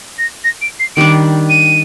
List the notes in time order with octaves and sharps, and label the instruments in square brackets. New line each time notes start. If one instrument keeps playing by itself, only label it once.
[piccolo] A#6
A#6
D7
C7
[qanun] D#3 G3 D4 [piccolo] D7
[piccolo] D#7